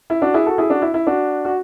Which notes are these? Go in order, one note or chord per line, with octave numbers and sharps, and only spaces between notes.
E4
D4 F#4
E4 G#4
F#4 A4
E4 G#4
D4 F#4
E4
E4
D4 F#4
F#4